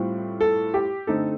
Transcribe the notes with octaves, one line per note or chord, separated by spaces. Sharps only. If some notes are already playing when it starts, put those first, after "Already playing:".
Already playing: A2 G3 C4 F4
A4
G4
D3 A3 C4 D#4 A4